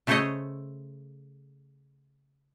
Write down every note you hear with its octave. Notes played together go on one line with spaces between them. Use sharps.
C#3 A3 A4 C5 C#5 D#5